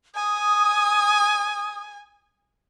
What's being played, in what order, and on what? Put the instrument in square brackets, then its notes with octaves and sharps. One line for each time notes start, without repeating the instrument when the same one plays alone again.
[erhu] G#5 [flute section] D#6